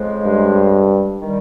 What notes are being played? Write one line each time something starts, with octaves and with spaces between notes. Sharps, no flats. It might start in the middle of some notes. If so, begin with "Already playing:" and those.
Already playing: F2 C#3 F3 G#3
G2
D#3 G3